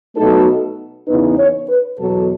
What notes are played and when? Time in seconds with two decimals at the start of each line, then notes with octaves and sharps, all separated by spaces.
0.16 B2 F#3 A3 D#4 A4
1.07 E2 C#3 E3 B3 D#4 B4
1.38 C#5
1.69 B4
1.99 E2 B2 F#3 A4